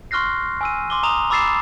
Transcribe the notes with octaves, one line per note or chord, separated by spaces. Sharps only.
C6 C#6 F6 F#6 A#6 C7
G#5 E6 D#7
C6 D6 G7
A#5 D#6 F7
B5 D6 E6 A6 C7 E7